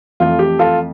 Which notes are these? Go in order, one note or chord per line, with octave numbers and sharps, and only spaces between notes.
F2 E3 A3 F4
G4
F4 A4